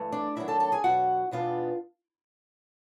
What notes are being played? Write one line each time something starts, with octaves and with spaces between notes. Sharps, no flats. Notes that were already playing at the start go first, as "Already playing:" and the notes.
Already playing: G2 E3 A3
D4 D5
F#2 D#3 F#3 A#3 D4 E4 E5
A4 A5
A4 A5
G#4 G#5
E2 B2 F#3 F#4 F#5
E2 B2 G#3 B3 D4 F4 F5